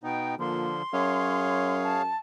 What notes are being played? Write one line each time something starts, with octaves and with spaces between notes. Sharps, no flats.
B2 B3 D#4 G5
A#2 D3 F3 C6
F#2 G#4 C#5 F5
A5